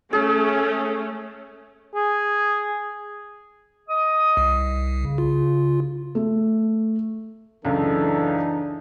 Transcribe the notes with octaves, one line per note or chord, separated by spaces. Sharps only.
A3 C#4 G#4 A4
G#4
D#5 D#6
C2
C#3
F4
A3
C#2 F#2 E3 D4 D#4 A4